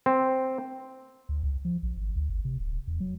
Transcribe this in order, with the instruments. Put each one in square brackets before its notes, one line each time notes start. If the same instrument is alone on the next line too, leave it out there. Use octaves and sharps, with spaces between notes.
[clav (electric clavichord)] C4
[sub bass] D2
C#2
F3
A#1
G#1
D2
G1
C3
D1
E2
F#3